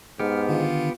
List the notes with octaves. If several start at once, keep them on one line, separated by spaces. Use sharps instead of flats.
G#2 B3 G4 F6
D3 D#3 D4 F4